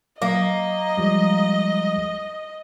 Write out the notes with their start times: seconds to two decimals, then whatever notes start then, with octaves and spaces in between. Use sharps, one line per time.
0.22 F#3 A#3 D#5
0.97 F3 G3 G#3